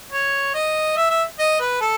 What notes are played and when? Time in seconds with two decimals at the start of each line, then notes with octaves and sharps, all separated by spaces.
0.12 C#5
0.54 D#5
0.96 E5
1.10 E5
1.39 D#5
1.60 B4
1.81 A4